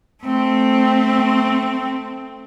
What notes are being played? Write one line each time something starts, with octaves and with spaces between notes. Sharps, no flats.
A3 C4